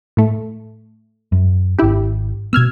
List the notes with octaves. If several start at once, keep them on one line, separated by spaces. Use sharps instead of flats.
A2 A3
F#2
G#1 D4 E4 G4
B2 B3 E6 F6 G#6